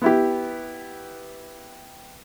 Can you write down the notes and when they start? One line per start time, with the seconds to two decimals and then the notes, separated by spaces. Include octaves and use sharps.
0.02 B3 E4 G4